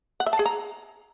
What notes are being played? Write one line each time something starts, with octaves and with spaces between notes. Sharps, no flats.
F#5
E5
A5
G#4
A#5